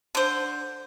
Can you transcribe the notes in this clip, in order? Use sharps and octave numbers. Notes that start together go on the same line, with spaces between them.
D3 C5